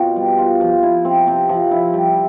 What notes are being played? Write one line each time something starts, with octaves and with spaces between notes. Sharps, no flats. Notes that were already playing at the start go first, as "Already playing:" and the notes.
Already playing: B2 C4 F4
G3
F4
F3
E4
C4
C3
F3
E4
G3